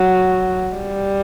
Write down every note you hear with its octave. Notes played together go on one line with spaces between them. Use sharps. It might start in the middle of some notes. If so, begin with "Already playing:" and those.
Already playing: F#3
G3